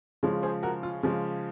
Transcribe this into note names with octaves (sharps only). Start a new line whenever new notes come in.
C#3 F3 G#3
G#4 C5
F#4 A#4
F4
C#3 F3 G#3